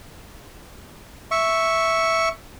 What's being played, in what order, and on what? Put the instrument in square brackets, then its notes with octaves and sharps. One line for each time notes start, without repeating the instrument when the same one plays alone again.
[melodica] E5 C#6